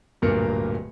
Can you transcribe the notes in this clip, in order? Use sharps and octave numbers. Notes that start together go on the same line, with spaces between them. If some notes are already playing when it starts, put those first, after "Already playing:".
D1 G2 A#2 A#3 A#4 C#7